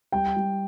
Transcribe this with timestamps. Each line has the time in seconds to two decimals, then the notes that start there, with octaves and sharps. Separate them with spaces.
0.12 G3 G5
0.37 G3